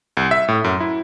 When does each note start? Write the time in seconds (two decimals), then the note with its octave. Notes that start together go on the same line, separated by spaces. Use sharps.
0.17 C2
0.31 E5
0.48 A2
0.64 F#2
0.80 E4